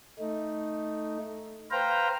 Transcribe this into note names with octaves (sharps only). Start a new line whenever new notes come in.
A3 D#4
B4 C5 F5 G5 A#5